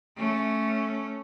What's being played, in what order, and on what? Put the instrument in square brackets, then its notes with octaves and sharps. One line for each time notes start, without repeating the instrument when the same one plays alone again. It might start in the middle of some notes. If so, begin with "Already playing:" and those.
[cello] A3 C#4